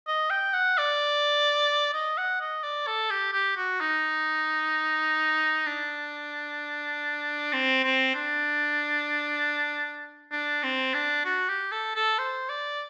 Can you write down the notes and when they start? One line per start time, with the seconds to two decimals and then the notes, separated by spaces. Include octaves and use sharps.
0.07 D#5
0.30 G5
0.54 F#5
0.78 D5
1.94 D#5
2.18 F#5
2.41 D#5
2.63 D5
2.87 A4
3.11 G4
3.33 G4
3.57 F#4
3.81 D#4
5.67 D4
7.53 C4
7.84 C4
8.15 D4
10.32 D4
10.63 C4
10.94 D4
11.25 F#4
11.49 G4
11.72 A4
11.96 A4
12.18 C5
12.50 D5